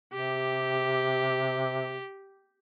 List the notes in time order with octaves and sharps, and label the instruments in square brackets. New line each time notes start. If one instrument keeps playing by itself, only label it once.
[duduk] C3 [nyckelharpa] G4